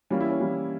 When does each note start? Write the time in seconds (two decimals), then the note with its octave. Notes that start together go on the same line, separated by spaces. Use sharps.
0.10 E3 G3 A#3 C#4
0.21 E4
0.30 C#4
0.40 E3 G3 A#3